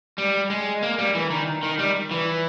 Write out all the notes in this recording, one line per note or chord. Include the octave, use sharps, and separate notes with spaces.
G3
G#3
A#3
G3
E3
D#3
D#3
G3
E3